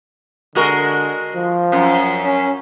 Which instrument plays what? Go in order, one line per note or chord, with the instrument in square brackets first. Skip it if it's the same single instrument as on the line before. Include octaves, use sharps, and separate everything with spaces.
[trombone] D3 [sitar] G#3 F#4 A#4
[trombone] F3
[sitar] F#2
[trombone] C#4